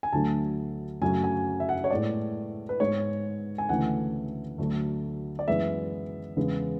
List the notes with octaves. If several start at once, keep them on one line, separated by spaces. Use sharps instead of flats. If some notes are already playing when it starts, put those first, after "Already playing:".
G#5
D2 D3 F#3 A3 A5
F#2 C#3 F#3 A3 G#5
G#5
E5
F#5
C#5
A2 G#3 B3 D5
B4
G#2 G#3 B3 C#5
G#5
D2 C#3 E3 A3 F#5
D2 D3 F#3 A3
D5
F#2 E3 G#3 B3 E5
E2 C#3 G#3 B3